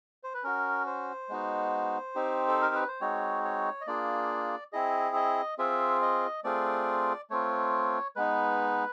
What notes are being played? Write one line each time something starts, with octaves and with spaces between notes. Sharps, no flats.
C5
B4
C#4 F#4 A#4
C5
G#3 B3 D#4 F#4
C4 D#4 G4
A4
A#4
B4
C5
G#3 C4 D#4 F#4 C#5
C#5
D#5
A#3 D4 F4 G#4 D5
C4 E4 G#4 D#5
D#5
C4 F4 G#4 E5
D#5
A3 C4 F4 G#4 D5
A3 C4 F4 C#5
G#3 B3 D#4 B4